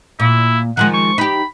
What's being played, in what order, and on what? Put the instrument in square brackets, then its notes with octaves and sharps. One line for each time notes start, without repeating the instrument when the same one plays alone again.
[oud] A#2 [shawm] E4
[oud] D#3 F3 G#3 [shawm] F#5
[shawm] C#6
[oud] D#4 G4 [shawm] B5